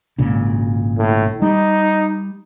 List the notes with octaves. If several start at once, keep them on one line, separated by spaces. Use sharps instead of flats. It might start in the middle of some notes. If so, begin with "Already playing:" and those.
G#1 A#2 C#3
A2
G3 D#4